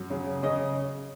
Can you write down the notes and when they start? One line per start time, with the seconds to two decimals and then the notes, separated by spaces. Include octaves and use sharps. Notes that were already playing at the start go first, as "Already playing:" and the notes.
Already playing: F#2
0.10 C#3
0.43 C#3 D#5